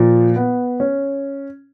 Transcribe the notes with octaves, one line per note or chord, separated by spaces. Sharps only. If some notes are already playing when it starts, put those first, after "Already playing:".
Already playing: A#2 F3
B3
C#4